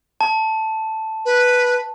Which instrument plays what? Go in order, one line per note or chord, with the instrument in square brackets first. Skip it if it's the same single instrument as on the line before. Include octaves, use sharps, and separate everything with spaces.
[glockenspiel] A5
[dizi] B4